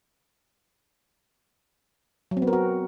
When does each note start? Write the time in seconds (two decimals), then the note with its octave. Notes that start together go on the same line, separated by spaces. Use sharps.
2.31 F#3
2.37 C4
2.42 B3
2.47 A#4
2.53 F#4